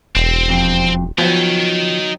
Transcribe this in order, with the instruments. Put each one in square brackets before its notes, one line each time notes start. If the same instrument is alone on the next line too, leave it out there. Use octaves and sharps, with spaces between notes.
[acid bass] E1 [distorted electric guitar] C4
[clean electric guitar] F2
[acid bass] F3 [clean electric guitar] F#3 B3 [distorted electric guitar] D#4 G5